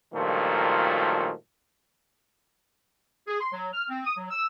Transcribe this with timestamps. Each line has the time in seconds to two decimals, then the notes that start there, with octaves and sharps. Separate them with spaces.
0.13 G2 A#2 D#3 F3 F#3 A3
3.28 G#4
3.40 C6
3.52 F#3
3.73 F6
3.89 C4
4.04 D#6
4.17 F#3
4.30 E6